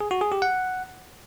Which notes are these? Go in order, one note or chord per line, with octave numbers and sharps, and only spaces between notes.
G#4
F#4
G#4
G4
F#5